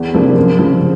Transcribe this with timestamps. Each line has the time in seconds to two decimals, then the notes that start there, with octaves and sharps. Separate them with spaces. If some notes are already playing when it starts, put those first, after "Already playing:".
Already playing: E2
0.13 C3 F3 A#3 D4
0.36 F#2
0.59 C#3 F3